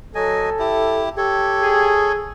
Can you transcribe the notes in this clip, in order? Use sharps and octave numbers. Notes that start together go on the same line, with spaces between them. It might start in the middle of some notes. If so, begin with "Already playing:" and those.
F#3 A4 D#5 G#5
E4 G4
G4 A4 C#5
G#4